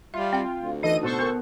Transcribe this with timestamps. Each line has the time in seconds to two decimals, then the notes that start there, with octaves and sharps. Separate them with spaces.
0.14 G3 F4 E5
0.33 C4 F5 G5
0.56 D2
0.83 E3 D#4 A4 D#5 D#7
1.03 B2 A4 C5 C#6
1.19 B3 A#4